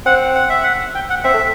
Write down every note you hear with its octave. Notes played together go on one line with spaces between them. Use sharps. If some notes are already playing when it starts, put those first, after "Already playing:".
C4 F#5
F#5
E5
F#5
G5
F#5
C4 E5
A3